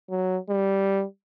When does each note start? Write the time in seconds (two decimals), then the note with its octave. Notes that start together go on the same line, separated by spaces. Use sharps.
0.10 F#3
0.49 G3